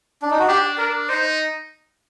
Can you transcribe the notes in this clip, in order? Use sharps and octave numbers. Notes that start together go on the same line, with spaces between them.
D4
D#4
F#4
D4 G4
D4 A#4
D#4 C5